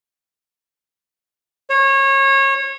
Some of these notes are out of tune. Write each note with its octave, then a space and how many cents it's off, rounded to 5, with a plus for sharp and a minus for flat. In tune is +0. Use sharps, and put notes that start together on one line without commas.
C#5 -25